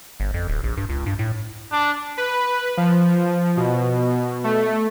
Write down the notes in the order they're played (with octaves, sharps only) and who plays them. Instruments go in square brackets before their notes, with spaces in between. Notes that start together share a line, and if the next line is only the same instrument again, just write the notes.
[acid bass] G1
F2
D1
A#1
G2
C#2
G2
A2
[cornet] D4
[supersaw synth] B4
F3
B2
A3